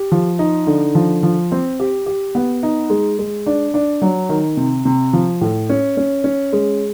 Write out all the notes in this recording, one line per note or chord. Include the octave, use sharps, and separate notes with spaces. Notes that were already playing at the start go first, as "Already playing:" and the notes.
Already playing: G4
F3
D#4
D3
F3
F3
C4
G4
G4
B3
D#4
G#3
G#3
D4
D4
F#3
D#3
C3
C3
F3
A2
C#4
C#4
C#4
G#3